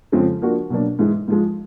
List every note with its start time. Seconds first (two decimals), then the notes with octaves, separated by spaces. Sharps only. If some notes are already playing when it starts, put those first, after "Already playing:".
0.12 F2 C#3 F3 G#3 C4
0.42 F3 A#3 D4 F#4 A#4
0.70 B2 F#3 A#3 D4
0.99 G#2 E3 G#3
1.28 G#2 F3 G#3